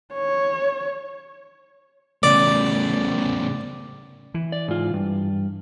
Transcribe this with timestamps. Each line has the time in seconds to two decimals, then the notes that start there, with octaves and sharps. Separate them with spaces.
0.14 C#5
2.23 A2 C#3 D5
4.34 E3
4.52 D5
4.68 G#2 F4
4.94 G2